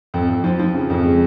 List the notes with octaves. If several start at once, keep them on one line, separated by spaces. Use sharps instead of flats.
F2
F2
F3
F3
C#3
F2
G#3